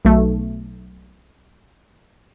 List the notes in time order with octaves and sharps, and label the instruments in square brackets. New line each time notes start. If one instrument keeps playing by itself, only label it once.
[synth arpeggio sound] B1 A3